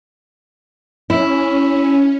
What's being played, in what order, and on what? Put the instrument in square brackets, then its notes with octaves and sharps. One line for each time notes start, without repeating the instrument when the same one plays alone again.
[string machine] C#4 [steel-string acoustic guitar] E4